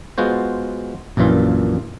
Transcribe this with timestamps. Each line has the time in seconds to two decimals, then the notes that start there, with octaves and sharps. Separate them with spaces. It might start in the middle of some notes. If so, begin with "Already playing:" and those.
0.18 G#3 B3 F4 F#4 C5
1.17 A#1 F#2 A#2 E3 F4